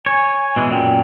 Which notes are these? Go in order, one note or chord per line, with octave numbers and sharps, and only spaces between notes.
C#5 G#5
B2 E3 G#3
F#2 A#2 F#3 G5